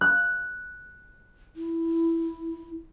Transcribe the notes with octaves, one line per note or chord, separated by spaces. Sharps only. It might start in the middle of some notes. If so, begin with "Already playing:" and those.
F#6
E4